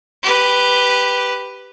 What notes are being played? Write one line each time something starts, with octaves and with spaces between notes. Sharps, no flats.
G4 B4